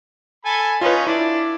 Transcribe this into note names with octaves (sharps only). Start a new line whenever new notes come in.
A4 G#5 B5
C#4 D#4 F4 B4
D4 E4